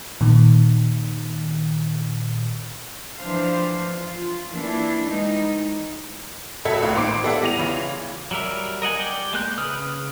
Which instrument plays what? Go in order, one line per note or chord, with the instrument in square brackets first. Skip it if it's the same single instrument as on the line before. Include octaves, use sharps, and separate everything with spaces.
[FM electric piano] A#2 D#3
[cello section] E3 F3 D4 C5 F5
F4
E3 A#3 D4 E4
E3 G3 G#3 D#4
[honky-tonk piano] C#2 F#3 A4 E5 G#6
C#2 A2 A#3 F4
A1 D#3 C5 D6 C7 D7
B3 G4 A4 D5 E5 F#5
E2 G3 E4 A#6 D#7 F7
C#3 E3 F4
[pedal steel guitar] F#3 G3 A#4 E5
A#4 D#5 F#5 G#5
G4 D5 G5
G#3 A#3 F#6 G6
C#3 B4 D#6 F6